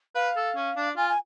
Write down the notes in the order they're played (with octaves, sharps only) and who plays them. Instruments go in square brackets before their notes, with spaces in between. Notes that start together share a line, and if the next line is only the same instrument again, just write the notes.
[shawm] B4 [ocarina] F5
[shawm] A4
C#4
D4
[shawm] F4 [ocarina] G#5
[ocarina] G#5